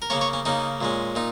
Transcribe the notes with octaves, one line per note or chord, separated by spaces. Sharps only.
A#4
C#3 A#3 C#4 C#5
C#5
C#4
C#3 A#3 C#4 D#4
A#2 G#3 C#4
A#2 D#4